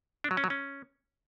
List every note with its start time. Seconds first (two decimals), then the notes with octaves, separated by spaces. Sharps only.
0.24 D4
0.31 F#3
0.37 C#4
0.44 F#3
0.50 C#4